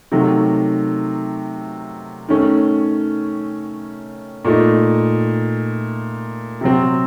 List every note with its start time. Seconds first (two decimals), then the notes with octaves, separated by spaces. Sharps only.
0.12 C3 D#3 F#3 A3
2.28 D#3 A3 C#4
4.45 A#2 A3 D#4
6.61 C3 F#3 C4